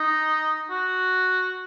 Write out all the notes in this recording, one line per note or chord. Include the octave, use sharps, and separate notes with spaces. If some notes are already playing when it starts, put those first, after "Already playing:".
Already playing: D#4
F#4